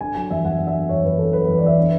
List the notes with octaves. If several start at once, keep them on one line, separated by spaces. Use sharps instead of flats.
D3 G#5
F#3 G#5
E2 E5
E2 F#5
D3
E5
F#3
E2 C#5
E2 B4
D3 A4
F#3 B4
E2 B4
D5
E2 E5
D3